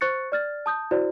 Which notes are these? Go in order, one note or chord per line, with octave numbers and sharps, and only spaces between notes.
C5 C#6 F#6 A6 C#7
D5 F6 A6
A5 D#6 G6
E4 F#4 C5 D5